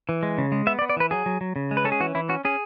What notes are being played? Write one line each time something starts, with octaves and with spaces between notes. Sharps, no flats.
E3
G#3
C#3
G#3
B3 E5
D5
B3
D5
E3 B4
F#3 G#4
F#3
F#3
C#3
G#3
B4
C#4 A4
G#4
E3 F#4
E3 E4
C#4 F#4
C#4 G#4